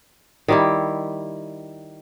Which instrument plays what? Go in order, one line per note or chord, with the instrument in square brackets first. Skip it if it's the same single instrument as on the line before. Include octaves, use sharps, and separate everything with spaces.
[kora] D#3 G3 E4